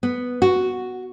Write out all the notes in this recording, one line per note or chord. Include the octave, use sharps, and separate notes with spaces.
B3
F#4